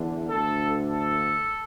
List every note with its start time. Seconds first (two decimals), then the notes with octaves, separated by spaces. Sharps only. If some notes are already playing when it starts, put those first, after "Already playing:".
Already playing: E2 D3
0.28 D2 D3 A4
0.86 A4